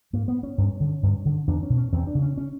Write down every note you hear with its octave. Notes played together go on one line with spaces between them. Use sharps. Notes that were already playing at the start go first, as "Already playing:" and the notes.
G#2 A#3
B3
C#4
G2
D3
G2
D3
E2 D4
C#4
B2
C#4
E2 C4
D4
C#3
C#4
C#4